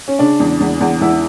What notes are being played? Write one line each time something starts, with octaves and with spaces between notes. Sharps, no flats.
C#4
C#3 D4
E2
E2
E2
E2 E4